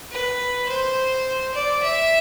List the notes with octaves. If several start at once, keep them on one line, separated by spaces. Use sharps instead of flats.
B4
C5
D5
E5